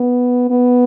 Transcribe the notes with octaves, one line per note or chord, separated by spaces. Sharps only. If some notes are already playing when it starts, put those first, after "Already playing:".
Already playing: B3
B3